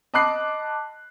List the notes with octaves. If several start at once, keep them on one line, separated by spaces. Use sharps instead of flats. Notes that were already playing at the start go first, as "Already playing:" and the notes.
D#5 A5 B5 D6 F#6 C7